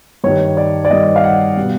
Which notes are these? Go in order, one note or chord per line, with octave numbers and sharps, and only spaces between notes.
G2 D#3 G3 C#5
D5
D5
G2 D#3 G3 D#5
F5
F#5
B2 G3